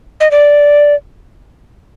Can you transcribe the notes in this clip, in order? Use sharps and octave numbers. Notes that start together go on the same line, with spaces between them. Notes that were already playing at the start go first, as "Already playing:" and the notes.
D#5
D5